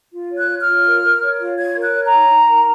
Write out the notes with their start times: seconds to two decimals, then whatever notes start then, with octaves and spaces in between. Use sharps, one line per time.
0.13 F4
0.32 C#5
0.38 F#6
0.50 C#5
0.61 F6
0.67 F4
0.85 A#4
1.03 A#4
1.22 C#5
1.40 F4
1.57 C#5 G#6
1.75 A#4
1.82 F#6
1.94 C#5
2.05 A#5
2.12 D#4
2.30 D#4
2.48 A#4